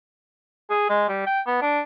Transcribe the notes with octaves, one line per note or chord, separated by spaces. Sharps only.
G#4
G#3
G3
G5
B3
D4